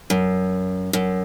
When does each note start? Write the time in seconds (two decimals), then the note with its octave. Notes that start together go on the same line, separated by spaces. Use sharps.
0.10 F#2
0.93 F#2